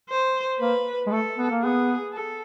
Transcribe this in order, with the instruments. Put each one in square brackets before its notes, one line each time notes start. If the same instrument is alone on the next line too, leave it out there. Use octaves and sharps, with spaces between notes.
[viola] C5
[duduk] A#3 [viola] B4
[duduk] G#3
[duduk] A3 [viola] A4
[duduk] B3
A#3
[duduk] B3 [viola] G#4
[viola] A4